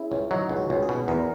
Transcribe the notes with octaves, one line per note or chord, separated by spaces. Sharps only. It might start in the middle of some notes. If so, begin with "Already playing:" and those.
Already playing: C#4 E4 G#4
C#2 C#4
F#3 D#4
C#2
F#4
C#2
G#4
B2
E2 A#4